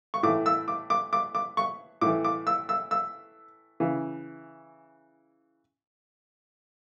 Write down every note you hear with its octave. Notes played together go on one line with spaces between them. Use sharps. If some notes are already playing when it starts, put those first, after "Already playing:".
C#6
A2 E3 D6
E6
D6
D6
D6
D6
C#6
A2 E3 D6
D6
E6
E6
E6
C#3 E3